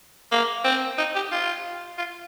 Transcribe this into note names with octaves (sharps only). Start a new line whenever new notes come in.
A#3
C4
D#4
G4
F4
F4